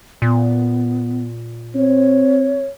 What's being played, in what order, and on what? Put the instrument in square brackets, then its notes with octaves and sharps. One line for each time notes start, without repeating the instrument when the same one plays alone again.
[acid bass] A#2 [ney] B3
[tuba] C4 [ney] C#5